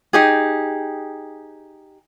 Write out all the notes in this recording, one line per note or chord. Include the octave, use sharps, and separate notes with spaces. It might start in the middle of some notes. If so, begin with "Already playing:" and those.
D#4 G4 G#4